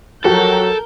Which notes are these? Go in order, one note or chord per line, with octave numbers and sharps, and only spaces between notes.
F3 F#3 F#4 G4 A4 A#4 G6